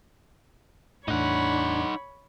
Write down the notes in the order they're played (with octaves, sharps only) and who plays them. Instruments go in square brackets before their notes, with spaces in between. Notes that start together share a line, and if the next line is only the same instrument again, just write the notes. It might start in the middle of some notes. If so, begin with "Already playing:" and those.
[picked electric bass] E2 A2 [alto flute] D4 [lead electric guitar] D#4 F#5 [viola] C#5 B5